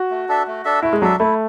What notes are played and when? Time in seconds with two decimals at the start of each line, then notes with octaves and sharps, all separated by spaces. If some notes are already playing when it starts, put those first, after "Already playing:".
Already playing: F#4
0.10 A3
0.29 D4 A4 E5
0.47 A3
0.65 D4 A4 E5
0.82 A3 E4
0.93 G#3
1.02 F#3 D4 A4 E5
1.19 A3 E4